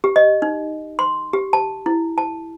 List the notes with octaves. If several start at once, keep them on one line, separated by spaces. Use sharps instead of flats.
G4
D#5
D#4
C6
G4
A5
E4
A5